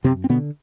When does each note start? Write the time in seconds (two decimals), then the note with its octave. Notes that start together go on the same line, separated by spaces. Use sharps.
0.04 F#2 C3 C4
0.24 C4
0.30 B2 D3 B3